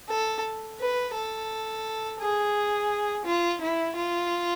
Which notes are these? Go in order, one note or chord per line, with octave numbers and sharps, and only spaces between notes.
A4
B4
A4
G#4
F4
E4
F4